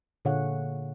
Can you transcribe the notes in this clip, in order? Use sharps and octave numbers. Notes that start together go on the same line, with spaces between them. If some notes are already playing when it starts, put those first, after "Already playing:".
A#2 D3 G#4 C#5 F5 F#5